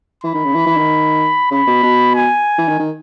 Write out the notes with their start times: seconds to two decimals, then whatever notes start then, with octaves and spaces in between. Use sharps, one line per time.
0.24 E3 B5
0.34 D#3
0.45 C#3
0.55 E3
0.67 E3
0.77 D#3
1.51 C#3 B5
1.67 B2
1.83 B2
2.15 G#5
2.58 E3
2.68 D#3
2.79 D#3